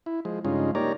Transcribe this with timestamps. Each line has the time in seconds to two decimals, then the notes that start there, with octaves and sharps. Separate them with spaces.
0.06 E4
0.25 F3 G#3
0.45 G2 C#3 G#3 C#4 D#4 F4
0.75 A#3 D#4 G4 C#5 D5 A#5